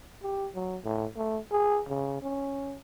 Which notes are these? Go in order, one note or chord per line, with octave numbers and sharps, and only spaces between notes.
G4
F#3
A2
A3
G#4
C#3
C#4